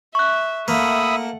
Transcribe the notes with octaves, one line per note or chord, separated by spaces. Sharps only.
E5 C#6 F#6
A3 A#3 E5 F#5 B5 D#6